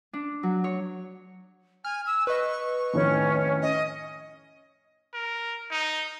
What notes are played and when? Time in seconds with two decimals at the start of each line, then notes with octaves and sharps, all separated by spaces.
0.13 D4
0.43 F#3
0.64 C#5
1.85 G#5 F6
2.06 E6
2.27 B4 D#5 C#6
2.94 F2 A2 D#3 C#4
3.62 D#5
5.14 A#4
5.71 D#4